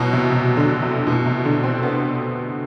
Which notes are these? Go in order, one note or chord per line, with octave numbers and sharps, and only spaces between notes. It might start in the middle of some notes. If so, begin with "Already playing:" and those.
Already playing: B2 F#3
C3
C3
D3
C3
B2
C3
D3
C4
B3